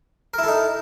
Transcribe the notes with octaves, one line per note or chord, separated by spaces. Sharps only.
D#4 E4 A4 A#4